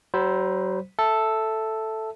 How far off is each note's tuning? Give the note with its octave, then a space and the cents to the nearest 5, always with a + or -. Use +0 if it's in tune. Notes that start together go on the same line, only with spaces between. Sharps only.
F#3 +35 C5 +0 B5 +0
A4 +0 E5 +0